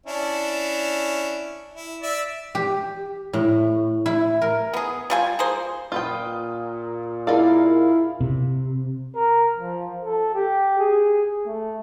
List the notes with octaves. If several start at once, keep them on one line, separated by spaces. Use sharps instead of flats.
C#4 D4 E4
E4
D5 E5
G4
A2
E4
A#4
B3 G#4
G3 F4 G#5
A#3 G#4 C5
A#2 F4 B4 G5 D#6 F6
D#4 E4 G#4 A#4 D5 F5
C3
A#4
F3
A4
G4
G#4
A3